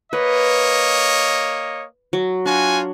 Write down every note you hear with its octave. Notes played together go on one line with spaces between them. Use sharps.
A#3 B4 C#5 D#5
F#3
D4 F4 F#4 G#5